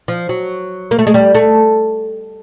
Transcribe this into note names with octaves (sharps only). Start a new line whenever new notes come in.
F3
F#3
A#3
A3
G#3
G3
A3